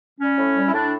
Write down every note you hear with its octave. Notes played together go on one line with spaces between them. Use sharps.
G3 C#4
A2
G3
E4
A2 D4